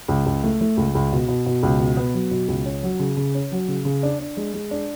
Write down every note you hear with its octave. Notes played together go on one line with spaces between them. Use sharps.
C#2
C#2
A3
A3
C#2
C#2
B2
B2
B2
C#2
B2
B3
F#3
B2
C#2
C#4
F#3
C#3
C#3
C#4
F#3
C#3
C#3
D4
D4
G#3
G#3
D4